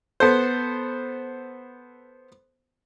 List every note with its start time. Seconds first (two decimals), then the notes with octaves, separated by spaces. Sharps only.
0.20 B3 A4 C5